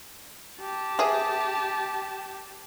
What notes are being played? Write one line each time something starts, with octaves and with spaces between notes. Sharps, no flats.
G4 A5
G#4 E5